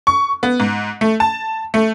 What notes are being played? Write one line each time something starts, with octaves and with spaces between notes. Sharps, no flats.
C#6
B3
G#2
A3
A5
A3